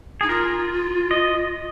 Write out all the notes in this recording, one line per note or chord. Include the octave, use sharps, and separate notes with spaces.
D#4 G#4
F4 A#4
D#5